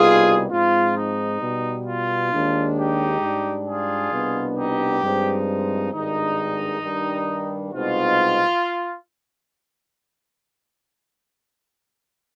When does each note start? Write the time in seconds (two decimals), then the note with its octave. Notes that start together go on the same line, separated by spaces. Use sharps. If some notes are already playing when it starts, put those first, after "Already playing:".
Already playing: C2 B2 G3 B3 D#4 F4 G#4
0.50 G#2 F3 G#3 C4 F4
0.96 D#4
1.40 B2 G3 B3
1.85 F4
2.31 D#2 D#3 G#3 D4
2.76 D#4 G4
3.21 G#2 G3 D4
3.66 F4 G#4
4.11 C2 B2 B3 D4
4.57 D#4 G4
5.02 G2 F3 G#3 C4 D#4
5.92 G#1 G2 D#3 G#3 D4 D#4
6.82 G2 D#3 G3 D4
7.72 C2 B2 G#3 C4 D#4 F4